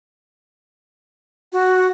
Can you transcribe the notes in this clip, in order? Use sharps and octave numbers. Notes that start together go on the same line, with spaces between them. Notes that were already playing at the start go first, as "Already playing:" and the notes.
F#4